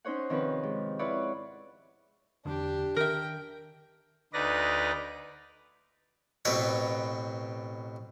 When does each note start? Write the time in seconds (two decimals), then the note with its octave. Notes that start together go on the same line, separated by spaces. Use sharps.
0.05 C#4 D#4 C5 C#5 F#5
0.29 C3 D#3 F3 C4 C#4 B4
0.63 G#2
0.99 E4 F4 B4 C#5 D5 F#5
2.46 E1 E2 D3 D4 G4
2.96 D#3 A#4 E5 G5
4.33 D2 D#4 B4 D5 A#6
6.45 A1 B2 C4 B4 C#5